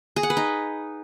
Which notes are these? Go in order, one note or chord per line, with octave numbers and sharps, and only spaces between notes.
G#4
F#5
B4
D#4